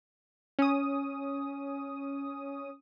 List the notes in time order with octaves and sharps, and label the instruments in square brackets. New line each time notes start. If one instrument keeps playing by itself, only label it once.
[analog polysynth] C#4 D#6